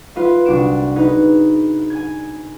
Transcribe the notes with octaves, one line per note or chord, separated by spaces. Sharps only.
F4 B4 E5
C2 D4 F#4 D7 E7
D#4 G#4 B4
G#5 G#6